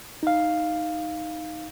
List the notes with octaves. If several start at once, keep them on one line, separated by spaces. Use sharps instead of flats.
D#4 F5